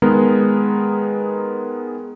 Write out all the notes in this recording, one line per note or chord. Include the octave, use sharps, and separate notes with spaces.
D#3 G#3 B3 G#4 A#4